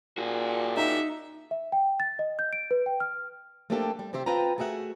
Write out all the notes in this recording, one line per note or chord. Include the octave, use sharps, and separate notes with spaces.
A#2 F#4 G#4
D#4 E5
E5
G5
A6
D#5
G6
D7
B4
G5
F6
A3 A#3 C4 D4 G4 A4
G3
C3 C4 G4 C5 E5
C4 F4 B4 G5 A5 A#5
A3 F#4 G#4 E5 F#5